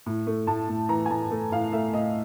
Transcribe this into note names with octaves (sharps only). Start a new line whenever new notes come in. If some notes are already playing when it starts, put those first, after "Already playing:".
A2
A3
A2 A5
A2
E3 A#5
G#5
A2 A5
A3
A2 F5
A3 E5
A2 D#5